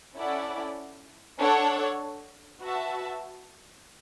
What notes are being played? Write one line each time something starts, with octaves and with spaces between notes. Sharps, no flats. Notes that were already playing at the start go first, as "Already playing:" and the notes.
C#4 E4 A4 D5 F#5
D4 A4 C#5 F#5
F#4 B4 E5 A5